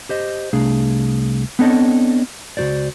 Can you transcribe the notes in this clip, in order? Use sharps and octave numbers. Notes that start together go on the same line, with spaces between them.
G4 C5 D#5
C2 A3 D4 G#4 F5
B3 C4 D4 A4 C#5 D#5
C#2 B2 F#4 C5 D5